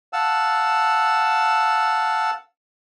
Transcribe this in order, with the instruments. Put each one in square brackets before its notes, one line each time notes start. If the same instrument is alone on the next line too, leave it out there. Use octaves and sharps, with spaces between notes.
[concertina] F5 F#5 A5 E6